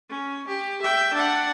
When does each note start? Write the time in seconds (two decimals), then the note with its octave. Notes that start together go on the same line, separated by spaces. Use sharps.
0.10 C#4
0.48 G4
0.82 E5 G5
1.14 D4 F#5